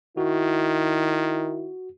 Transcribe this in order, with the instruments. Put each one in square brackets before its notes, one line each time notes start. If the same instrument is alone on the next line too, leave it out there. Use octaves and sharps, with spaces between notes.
[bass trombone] D#3 [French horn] E4 [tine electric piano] F#4